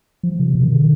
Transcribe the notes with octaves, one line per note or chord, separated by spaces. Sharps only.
F3
C3
B2
D#3
D3